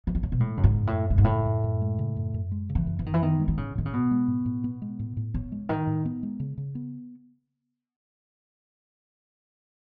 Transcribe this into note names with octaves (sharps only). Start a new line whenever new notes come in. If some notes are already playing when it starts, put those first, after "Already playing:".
E3
D#3
C#3
B2
A2 G#3
F#2 C#3
G#2
F#2
A2
F#2
A2 G#3
G#2
A2 C#3
F#2
F#2
G#3
C#3
F#2
F#2
G#3
C#3
E3
F#2
E3
F#2 D#3
E3
D#3 B3
G#3
D#3
A2 C#3
A2 D#3
C#3
B2 B3
G#3
A2
A2
B3
G#3
A2
A2
C#3 B3
G#3
A2 D#3
A2
B3
G#3
C#3
C#3
B3